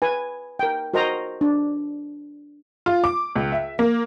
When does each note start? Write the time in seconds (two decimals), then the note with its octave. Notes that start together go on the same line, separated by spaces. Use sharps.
0.02 B4 G#5
0.59 A#4 G5
0.94 F#4 A#4 C5 D#5 A#5
1.41 D4
2.86 F4
3.04 D6
3.36 C#2
3.52 E5
3.79 A#3